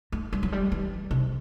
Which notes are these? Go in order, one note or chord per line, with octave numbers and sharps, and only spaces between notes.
A3
G3
F#3
G3
E3
C3